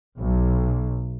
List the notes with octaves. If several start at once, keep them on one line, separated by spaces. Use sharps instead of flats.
B1